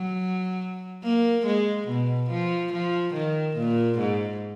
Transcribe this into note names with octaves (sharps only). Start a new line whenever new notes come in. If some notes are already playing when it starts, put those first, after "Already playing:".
Already playing: F#3
A#3
G#3
B2
F3
F3
D#3
A#2
G#2